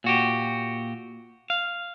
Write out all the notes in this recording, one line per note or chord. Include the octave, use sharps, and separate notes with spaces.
A#2 F#4 G4
F5